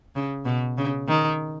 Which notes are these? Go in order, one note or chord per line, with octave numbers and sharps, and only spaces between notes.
C#3
B2
C#3
D#3